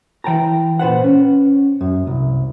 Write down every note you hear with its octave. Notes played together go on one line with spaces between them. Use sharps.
E3 G5 A5 A#5
A#2 B4 C5 F#5
C#4
F#2
C2